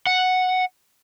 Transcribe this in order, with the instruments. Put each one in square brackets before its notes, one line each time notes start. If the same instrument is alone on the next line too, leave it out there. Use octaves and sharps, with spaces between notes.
[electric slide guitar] F#5